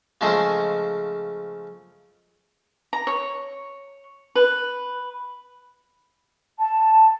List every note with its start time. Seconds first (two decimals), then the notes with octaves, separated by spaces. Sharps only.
0.21 C#3 F3 G#3 A3 G#4 C5
2.93 A#5
3.07 C#5
4.35 B4
6.60 A5